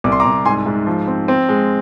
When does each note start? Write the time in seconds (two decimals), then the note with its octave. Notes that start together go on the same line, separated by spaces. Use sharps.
0.04 C2 D6
0.12 C6
0.20 A#5 D6
0.25 C2
0.45 G#2 G#5 C6
0.66 G#2
0.86 F3
1.07 C4
1.28 C4
1.49 G#3